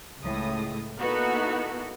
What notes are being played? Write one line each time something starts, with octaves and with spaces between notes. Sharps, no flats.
C#2 A2 G#3 D#6
A#3 B3 D#4 E4 F#4 A4